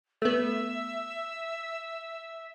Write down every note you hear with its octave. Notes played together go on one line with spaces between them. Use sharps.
A3 B3 E5